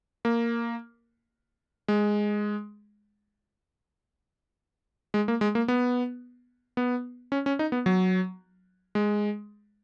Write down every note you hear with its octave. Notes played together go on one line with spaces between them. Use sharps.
A#3
G#3
G#3
A#3
G#3
A#3
B3
B3
C#4
C#4
D#4
B3
F#3
G#3